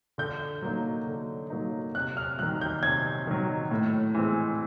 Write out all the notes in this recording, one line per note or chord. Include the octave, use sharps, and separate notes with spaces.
D3 G6
F#3 A#3 D#4
D3
F#3 A#3 D#4
C3 F#6
F6
D#3 F#3 F#6
G6
C3 G#6
D#3 F#3
A2
E3 G#3 C4